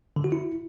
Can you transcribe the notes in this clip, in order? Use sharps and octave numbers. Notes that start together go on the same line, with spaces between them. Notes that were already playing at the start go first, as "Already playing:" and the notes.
D3
F#4
E4